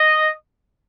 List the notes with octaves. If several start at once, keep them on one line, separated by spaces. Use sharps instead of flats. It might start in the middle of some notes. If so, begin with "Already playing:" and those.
Already playing: D#5